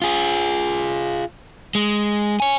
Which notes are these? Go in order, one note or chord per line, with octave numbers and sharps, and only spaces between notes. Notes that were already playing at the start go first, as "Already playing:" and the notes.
F4 G#4
G#3
C#5 G#5